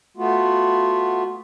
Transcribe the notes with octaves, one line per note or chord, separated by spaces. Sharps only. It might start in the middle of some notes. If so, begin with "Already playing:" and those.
A3 B3 F4 F#4